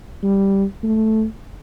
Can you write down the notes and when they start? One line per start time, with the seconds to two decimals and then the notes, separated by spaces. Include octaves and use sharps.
0.23 G3
0.83 A3